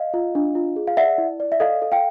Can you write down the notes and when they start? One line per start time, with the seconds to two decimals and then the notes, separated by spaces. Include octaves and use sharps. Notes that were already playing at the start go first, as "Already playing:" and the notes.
Already playing: D#5 F5
0.14 F4
0.35 D4
0.55 F4
0.76 G#4
0.87 F5
0.97 D5 E5 F#5
1.18 E4
1.40 D5
1.52 E5
1.60 A4 D#5 F5
1.82 A4
1.92 F5 G5